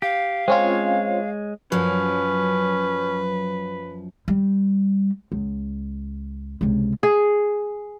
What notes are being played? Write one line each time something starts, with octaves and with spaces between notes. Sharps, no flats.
G4 F5
G#3 C4 C#4 F4 C#5
F#2 F3 F#3 C#4 B4
G3
C#2
C#2 C3
G#4